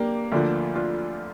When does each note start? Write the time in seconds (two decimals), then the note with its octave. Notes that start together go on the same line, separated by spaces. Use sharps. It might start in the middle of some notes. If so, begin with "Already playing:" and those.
Already playing: A#3 D4 G4 A#4
0.32 D2 D3 F3 A#3 D4
0.75 D4 F4